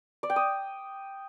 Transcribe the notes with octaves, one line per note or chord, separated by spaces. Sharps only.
D5
G5
D#6